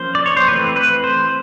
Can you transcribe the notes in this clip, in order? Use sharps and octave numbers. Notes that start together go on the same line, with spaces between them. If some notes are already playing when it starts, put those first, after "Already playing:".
Already playing: F3 A#3 C#4 C5
D5
C#5
C5
E3 A3 C4 B4
B4
C5